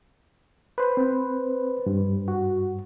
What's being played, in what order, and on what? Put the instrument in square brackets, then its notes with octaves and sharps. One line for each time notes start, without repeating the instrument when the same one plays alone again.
[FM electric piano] B4 C5
[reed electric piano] C4
G2
[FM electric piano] F#4